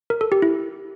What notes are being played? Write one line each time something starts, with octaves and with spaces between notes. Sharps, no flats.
A#4
A4
G4
E4